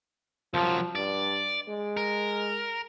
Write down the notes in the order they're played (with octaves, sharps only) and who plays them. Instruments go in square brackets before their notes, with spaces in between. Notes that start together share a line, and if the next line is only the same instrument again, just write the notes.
[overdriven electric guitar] C2 F#3 [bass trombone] F3
[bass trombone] G2 [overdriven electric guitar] D5
[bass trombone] G#3
[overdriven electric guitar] A#4